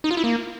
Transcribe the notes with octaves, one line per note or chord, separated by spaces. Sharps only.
D#4
F4
E4
A#3